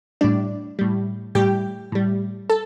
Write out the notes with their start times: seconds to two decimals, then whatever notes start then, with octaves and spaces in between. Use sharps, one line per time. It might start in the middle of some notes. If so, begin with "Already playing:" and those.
0.21 A2 G3 D4 D5
0.79 A2 G3
1.35 A2 G3 G4 G5
1.92 A2 G3
2.50 A4 A5